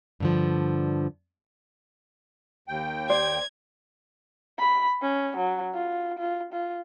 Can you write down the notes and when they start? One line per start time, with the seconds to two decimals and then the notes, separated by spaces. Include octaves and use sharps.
0.20 G2 D3 F3
2.68 D#2 G5
3.09 C5 D5 G#6
4.59 B5
5.02 C#4
5.37 F#3
5.74 F4
6.19 F4
6.53 F4